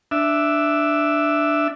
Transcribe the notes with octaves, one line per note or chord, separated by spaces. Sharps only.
D4 E5